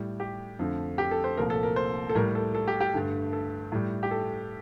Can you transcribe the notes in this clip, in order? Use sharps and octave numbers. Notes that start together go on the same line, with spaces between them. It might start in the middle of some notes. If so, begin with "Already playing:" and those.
Already playing: A2 G3
G4
F2 D3 A3
G4
A4
C5
C2 A#2 F3 A3 A#4
A4
A#4
C5
A4
A2 G3 A#4
A4
A4
G4
G4
G2 D3 A3
A4
A2 G3
G4
A4